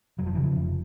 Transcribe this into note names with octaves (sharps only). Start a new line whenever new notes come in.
F1 F#3
F3
C#3 E3
F3
F1